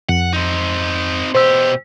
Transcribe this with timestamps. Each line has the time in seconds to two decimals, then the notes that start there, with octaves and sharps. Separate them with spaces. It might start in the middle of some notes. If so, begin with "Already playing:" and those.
0.09 F2 F#5
0.33 C4 D#4
1.35 B2 G4 C5 E6